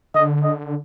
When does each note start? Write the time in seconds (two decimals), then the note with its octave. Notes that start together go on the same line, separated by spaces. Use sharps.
0.15 D3 D#5
0.44 D#5